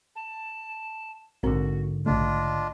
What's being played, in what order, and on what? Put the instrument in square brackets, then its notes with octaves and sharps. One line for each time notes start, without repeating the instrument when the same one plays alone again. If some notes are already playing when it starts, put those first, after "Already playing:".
[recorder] A5
[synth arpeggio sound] A#1 C4 A#4 [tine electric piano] G#2 D3 [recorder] F#4
[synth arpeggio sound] A#1 C#3 A3 [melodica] D4 F4 [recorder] D#5